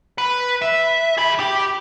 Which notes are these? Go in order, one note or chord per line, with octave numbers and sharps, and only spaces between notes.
B4
E5
G#4 B5
G4